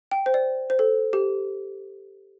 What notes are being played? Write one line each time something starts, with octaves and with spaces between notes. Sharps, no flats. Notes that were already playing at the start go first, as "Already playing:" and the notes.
G5
C5
D5
C5
A4
G4